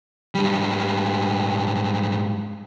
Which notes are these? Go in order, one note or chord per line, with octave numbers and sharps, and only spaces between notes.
G#2 G3